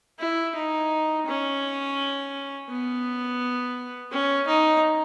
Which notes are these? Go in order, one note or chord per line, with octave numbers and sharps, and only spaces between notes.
E4
D#4
C#4
B3
C#4
D#4